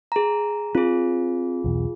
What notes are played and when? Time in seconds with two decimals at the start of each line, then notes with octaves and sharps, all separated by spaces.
0.12 G#4 A#5
0.75 C4 F4 G#4
1.64 B1 E2 B2